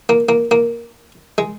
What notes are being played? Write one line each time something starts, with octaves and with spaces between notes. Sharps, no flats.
A#3
A#3
A#3
G#3